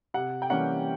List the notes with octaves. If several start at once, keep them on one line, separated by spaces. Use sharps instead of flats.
C3 F#5
G5
E3 G3 A#3 C#4 F#5